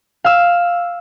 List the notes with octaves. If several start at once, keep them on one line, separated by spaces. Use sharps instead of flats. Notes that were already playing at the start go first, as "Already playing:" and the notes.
F5 E6